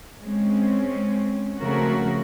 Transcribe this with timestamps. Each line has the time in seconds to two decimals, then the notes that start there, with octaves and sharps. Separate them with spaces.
0.23 G#3 C4 C#4
1.60 C#3 F3 A3 C4 F#4 A#4